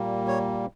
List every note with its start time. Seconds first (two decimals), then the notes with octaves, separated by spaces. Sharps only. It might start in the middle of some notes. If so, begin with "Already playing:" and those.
Already playing: A#2 G3 A#3
0.27 C#5